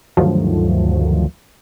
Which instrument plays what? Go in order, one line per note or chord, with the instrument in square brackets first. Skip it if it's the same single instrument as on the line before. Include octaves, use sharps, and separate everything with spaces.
[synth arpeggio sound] D2 G2 D#3 F3 F#3 A3